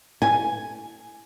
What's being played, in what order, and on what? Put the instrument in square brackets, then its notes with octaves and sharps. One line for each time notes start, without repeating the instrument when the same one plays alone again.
[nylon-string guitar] G#5